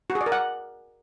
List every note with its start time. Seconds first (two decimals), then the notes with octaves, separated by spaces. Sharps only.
0.10 F#4
0.15 G#4
0.21 D5
0.26 A#4
0.32 F#5